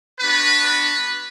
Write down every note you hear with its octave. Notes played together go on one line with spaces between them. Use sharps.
B3 D4 F#4 B4
B4